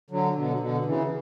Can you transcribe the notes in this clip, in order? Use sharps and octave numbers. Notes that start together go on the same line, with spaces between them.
D3 F#3
B2 D3
B2 D3
C#3 E3